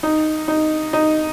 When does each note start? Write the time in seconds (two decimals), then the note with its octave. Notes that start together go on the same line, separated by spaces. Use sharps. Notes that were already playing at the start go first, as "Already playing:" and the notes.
0.03 D#4
0.48 D#4
0.93 D#4